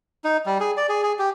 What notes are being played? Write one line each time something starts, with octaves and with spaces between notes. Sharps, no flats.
D#4
G3
G#4
D5
G#4
G#4
G4